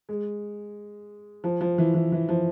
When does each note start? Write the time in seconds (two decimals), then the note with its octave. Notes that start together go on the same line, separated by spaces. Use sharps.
0.09 G#3
1.44 F3
1.61 F3
1.78 E3
1.94 E3
2.12 E3
2.29 F3